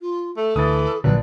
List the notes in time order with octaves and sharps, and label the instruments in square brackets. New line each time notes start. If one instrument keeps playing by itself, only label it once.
[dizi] F4
[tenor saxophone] A3 [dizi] A4
[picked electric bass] D2 [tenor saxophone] E3 [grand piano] D#6 A6
[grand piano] A#1 [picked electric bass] D3 F#3 [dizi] B4